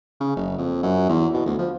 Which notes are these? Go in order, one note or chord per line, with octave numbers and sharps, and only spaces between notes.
C#3
F#1
F2
F#2
E2
B2
D2
F3